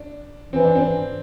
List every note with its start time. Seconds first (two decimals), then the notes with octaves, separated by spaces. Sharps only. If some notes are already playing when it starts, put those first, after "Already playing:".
Already playing: D4
0.53 E3 C4
0.64 D4
0.75 C4